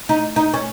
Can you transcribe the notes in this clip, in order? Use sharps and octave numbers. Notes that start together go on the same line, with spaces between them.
D#4
D#4
C#4